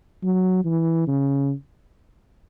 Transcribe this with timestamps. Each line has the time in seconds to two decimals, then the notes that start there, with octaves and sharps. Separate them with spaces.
0.23 F#3
0.65 E3
1.07 C#3